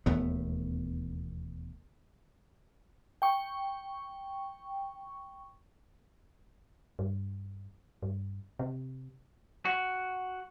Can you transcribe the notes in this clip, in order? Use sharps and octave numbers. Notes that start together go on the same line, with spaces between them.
E1 D#2 A3 B3
G5 C#6
G2
G2
C3
F#4